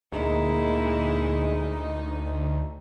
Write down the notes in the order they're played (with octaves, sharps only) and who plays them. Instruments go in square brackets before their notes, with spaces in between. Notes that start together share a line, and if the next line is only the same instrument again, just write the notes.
[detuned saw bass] D2 [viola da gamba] A#2 A#3 E4 [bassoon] G#3 [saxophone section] D#4